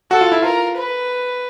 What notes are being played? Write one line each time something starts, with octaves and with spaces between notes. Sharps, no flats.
F#4 A4
F4
E4
F4 A#4
B4